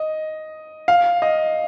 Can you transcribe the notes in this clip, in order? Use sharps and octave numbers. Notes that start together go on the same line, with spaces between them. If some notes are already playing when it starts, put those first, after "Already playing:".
Already playing: D#5
F5
D#5